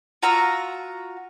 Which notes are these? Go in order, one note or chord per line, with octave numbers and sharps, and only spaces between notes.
F4 F#4 A#5 E6